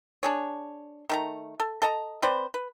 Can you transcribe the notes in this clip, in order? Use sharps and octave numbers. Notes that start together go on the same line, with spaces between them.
D4 G#4 C#5
D#3 A3 A#5
A4
A4 D#5 A5 A#5
C4 B4 C5 D5
B4